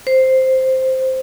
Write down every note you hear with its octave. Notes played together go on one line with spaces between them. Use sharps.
C5